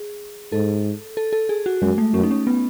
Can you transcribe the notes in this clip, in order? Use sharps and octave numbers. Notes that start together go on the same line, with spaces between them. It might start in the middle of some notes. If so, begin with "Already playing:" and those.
Already playing: G#4
G#2 A4
A4
A4
G#4
F#4
F#2 G#3
A3
F#2 C#4
D#4
C#4
B3